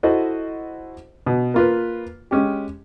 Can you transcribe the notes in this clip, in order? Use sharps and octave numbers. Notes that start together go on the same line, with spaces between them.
E4 F#4 A4 C5 D#5
B2
A#3 F4 B4
G#3 C#4 G4